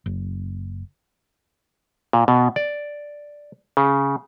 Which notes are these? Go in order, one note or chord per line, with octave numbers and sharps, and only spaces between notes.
F#1
A#2
B2
D5
C#3